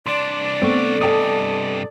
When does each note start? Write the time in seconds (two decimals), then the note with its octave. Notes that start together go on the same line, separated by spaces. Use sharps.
0.07 C2 D4 D5 C6
0.62 A3 B3 C4 C#6
1.01 G2 C3 A4 D#5 F#5 G#5 A5 D#6